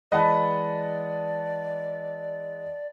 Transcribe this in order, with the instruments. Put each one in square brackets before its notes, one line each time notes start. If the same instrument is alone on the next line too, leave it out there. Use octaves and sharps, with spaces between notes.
[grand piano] E3 G#3 [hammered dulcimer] B4 [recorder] D5 [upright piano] D#5 F#5 A5